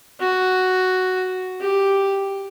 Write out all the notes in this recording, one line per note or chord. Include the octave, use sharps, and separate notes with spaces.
F#4
G4